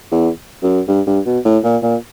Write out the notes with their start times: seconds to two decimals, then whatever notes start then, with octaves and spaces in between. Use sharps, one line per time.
0.11 E2
0.63 F#2
0.88 G2
1.07 G2
1.26 B2
1.45 A2
1.64 A#2
1.82 A#2